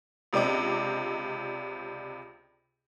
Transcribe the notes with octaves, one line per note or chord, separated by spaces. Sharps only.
C#2 C3 C4 D4 D#5 D6